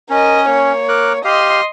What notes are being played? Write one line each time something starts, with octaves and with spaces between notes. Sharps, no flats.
C#4 A#4 D#5
A#3 C#5
A#4 D6 F#6
G4 D#5 F5 C6